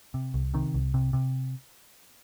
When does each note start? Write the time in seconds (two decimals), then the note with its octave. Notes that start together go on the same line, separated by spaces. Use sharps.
0.14 C3
0.34 C2
0.54 C3 D#3
0.74 C2
0.94 C3
1.13 C3